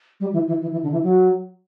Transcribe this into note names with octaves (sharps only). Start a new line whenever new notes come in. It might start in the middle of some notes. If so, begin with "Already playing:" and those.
G3
E3
E3
E3
E3
D3
E3
F#3